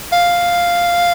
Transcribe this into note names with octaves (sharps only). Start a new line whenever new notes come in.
F5